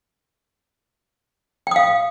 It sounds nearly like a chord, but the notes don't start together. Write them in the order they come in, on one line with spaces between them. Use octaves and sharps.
G5 D#6 F5